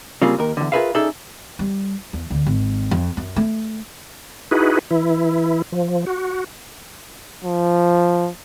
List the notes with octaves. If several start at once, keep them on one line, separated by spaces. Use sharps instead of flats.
C#3 G3 A#3 C4 F4 G#4
D#2 A#4
E2 D3
F4 G#4 A#4 B4 E5 F5
C#4 D#4 G#4 A4 D5 E5
G3
E2
D2
G#1
F2
F#2
A3
D#4 E4 F#4 G#4 B4
E3 E4
F3
F#4
F3